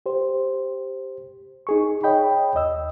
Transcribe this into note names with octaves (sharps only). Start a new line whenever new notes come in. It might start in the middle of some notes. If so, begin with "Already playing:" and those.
G4 C5
D#4 G#4 C#6
C#5 D#5 G5 B5
D#2 D#5 E6